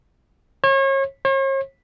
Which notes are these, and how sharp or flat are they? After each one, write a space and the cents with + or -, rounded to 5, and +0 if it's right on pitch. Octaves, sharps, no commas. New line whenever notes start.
C#5 -35
C#5 -45